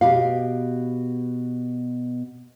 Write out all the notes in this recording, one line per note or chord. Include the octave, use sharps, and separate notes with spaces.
B2 G4 F5